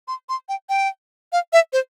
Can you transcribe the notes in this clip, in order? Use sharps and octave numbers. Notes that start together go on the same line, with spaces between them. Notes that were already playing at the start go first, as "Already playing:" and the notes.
C6
C6
G5
G5
F5
E5
C5